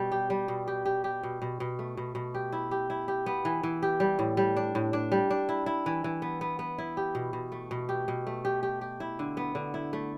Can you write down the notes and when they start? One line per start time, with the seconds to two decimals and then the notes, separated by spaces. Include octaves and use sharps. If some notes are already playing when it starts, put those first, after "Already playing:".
Already playing: B2 G3
0.12 G4
0.30 G3
0.48 B2
0.68 G4
0.85 G4
1.04 G4
1.23 B2
1.42 B2
1.60 B2
1.79 A3
1.97 B2
2.15 B2
2.34 G4
2.52 E4
2.71 G4
2.90 E4
3.08 G4
3.26 B3
3.45 E3
3.63 E3
3.83 G4
4.00 G3
4.19 A2
4.37 G3
4.56 D4
4.75 A2
4.93 D4
5.12 G3
5.31 D4
5.49 E4
5.66 E4
5.86 E3
6.04 E3
6.22 B3
6.41 B3
6.59 B3
6.78 E4
6.97 G4
7.15 B2
7.33 B2
7.52 A3
7.71 B2
7.89 G4
8.08 B2
8.27 A3
8.45 G4
8.63 G4
8.81 G4
9.00 E4
9.19 D3
9.37 B3
9.55 D3
9.74 E4
9.93 A3